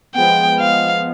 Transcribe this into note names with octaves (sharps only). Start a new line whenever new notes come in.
F3 G#3 B3 G5
F5